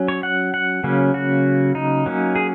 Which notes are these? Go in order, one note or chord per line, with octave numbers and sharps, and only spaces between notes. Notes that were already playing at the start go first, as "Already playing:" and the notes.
Already playing: F#3 C#4
C#5
F#5
F#5
C#3 F#3 A#3 C#4
F#4
D#4
F#3 A#3 C#4
G#4